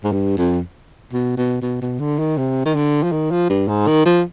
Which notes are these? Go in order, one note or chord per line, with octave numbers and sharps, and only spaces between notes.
G#2
G2
F2
B2
B2
B2
B2
D3
D#3
C3
D#3
D3
F3
D#3
F3
G2
G#2
D#3
F3